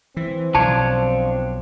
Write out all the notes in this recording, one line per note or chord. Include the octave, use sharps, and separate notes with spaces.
E3 C4
B1 F3 D4 C#5 A5